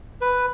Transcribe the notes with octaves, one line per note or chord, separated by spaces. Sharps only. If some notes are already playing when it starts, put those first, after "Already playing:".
B4